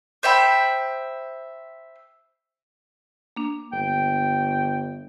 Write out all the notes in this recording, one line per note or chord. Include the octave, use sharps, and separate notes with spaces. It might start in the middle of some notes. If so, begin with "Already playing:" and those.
C5 E5 G5 B5
A#3 D4
G1 G5